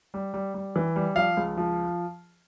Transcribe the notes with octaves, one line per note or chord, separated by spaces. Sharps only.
G3
G3
G3
E3
G3
F3 F5
C#2
F3